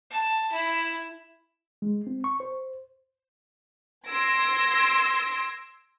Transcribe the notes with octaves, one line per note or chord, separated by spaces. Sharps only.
A5
E4
G#3
C4
C#6
C5
C6 E6 G#6 A#6 D7